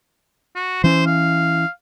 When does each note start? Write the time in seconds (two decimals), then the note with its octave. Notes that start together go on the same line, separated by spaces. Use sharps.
0.56 F#4
0.84 E3 C#4 C5
1.06 F5